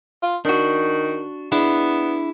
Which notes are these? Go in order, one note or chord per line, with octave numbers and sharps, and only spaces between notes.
F4
D#3 D4 F#4
B3 D4 E4 G#4